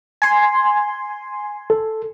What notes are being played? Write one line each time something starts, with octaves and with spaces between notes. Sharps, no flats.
G#5 C6
A4